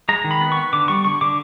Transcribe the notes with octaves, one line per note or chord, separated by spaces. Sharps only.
G#3 A#5
D#3
B5
B3
B3 C#6
D3 D6
G3 C#6
D3 C#6
D3 D6